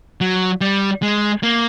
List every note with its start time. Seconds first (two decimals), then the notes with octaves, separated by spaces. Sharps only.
0.21 F#3
0.61 G3
1.02 G#3
1.43 A#3